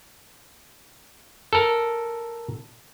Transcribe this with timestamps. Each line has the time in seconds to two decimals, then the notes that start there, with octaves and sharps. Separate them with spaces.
1.53 A4 A#4